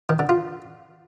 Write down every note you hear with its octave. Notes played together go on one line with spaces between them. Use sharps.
D#3
D3
F4